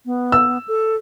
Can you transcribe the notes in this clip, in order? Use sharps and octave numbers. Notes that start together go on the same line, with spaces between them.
B3
E6
A4